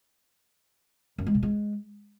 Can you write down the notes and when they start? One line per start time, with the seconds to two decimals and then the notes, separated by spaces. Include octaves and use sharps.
1.18 F#2
1.27 G#3
1.35 B2
1.43 G#3